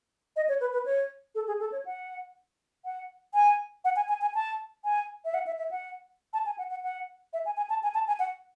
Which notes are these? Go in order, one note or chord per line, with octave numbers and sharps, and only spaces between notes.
D#5
C#5
B4
B4
C#5
A4
G#4
A4
C#5
F#5
F#5
G#5
F#5
G#5
G#5
G#5
A5
G#5
E5
F#5
E5
E5
F#5
A5
G#5
F#5
F#5
F#5
E5
G#5
G#5
A5
G#5
A5
G#5
F#5